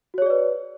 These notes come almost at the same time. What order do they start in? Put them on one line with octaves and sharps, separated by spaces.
F#4 C#5 G#4 D5 B4